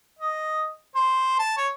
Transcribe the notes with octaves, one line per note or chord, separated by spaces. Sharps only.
D#5
C5
A5
C#5